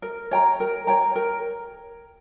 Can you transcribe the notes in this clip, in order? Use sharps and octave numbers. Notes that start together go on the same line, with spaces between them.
A#4
C#5 G5 A#5
A#4
C#5 G5 A#5
A#4